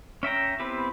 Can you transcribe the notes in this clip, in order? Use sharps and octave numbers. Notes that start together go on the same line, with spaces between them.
C#4 E5 G5 A#5
B3 C4 E4 G4 B4